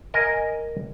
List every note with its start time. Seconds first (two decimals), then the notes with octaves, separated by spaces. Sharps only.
0.14 A#4 D#5 G#5